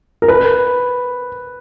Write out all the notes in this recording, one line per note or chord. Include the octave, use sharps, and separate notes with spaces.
A#4
B4